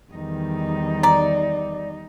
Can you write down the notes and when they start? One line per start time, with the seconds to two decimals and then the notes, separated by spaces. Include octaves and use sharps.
0.12 E2 D#3 G3 D#4
1.03 D5 A#5